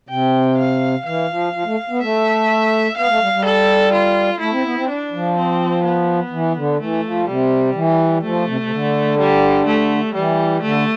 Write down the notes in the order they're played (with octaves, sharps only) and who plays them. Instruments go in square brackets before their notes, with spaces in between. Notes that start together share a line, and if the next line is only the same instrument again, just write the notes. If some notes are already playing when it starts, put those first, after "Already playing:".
[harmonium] C3 [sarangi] G5
[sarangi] F5
[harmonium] E3 [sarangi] F5
[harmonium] F3
F3
A3
B3
[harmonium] A3 [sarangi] E5
[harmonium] B3 [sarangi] F5
[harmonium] A3
G3
G3
[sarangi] A4
F4
[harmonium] A3 [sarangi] E4
[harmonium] C4
B3
C4
[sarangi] D4
[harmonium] F3
[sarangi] C4
B3
[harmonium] E3
D3
[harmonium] E3 [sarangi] A3
[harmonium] F3
[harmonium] C3 [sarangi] G3
[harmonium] E3
[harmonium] F3 [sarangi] A3
[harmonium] C3
C3
D3
[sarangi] G3
A3
[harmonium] E3 [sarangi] G3
[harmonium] D3 [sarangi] A3